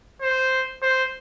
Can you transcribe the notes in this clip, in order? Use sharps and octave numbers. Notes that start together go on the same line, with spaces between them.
C5
C5